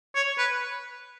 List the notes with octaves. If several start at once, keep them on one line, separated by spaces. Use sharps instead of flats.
C#5
B4